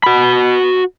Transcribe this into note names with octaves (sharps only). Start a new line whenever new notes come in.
F#4 B5